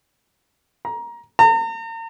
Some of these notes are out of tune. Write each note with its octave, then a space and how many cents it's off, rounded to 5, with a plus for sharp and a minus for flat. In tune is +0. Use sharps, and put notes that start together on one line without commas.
A#5 +20
A#5 -40